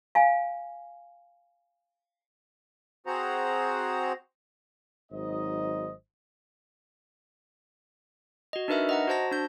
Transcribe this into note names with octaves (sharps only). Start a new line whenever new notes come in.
F5 G#5
C4 F#4 G#4 C5 F#5 A#5
G#1 F#3 D#4 C5 D#5
F#4 D#5
D4 D#4 A#4 B4 E5 F6
D#5 F#5 A#5
F#4 C5 A5 A#6
D4 G6